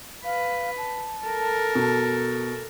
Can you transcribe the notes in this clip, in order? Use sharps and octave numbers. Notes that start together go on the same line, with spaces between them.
B4 F5
A5
A4 A#4
B2